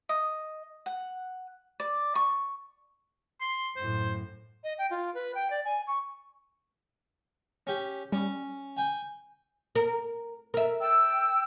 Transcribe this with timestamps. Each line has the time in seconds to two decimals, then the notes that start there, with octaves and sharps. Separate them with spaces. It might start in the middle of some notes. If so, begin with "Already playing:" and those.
0.09 D#5
0.86 F#5
1.80 D5
2.15 C#6
3.41 C6
3.76 F#2 A2 C5
4.64 D#5
4.78 G5
4.91 F4
5.14 B4
5.35 G5
5.51 D5
5.65 G#5
5.87 C#6
7.67 C#4 G4
8.12 G3 C#4
8.77 G5 G#5
9.75 A#4
10.54 A#4 E5
10.81 G5 E6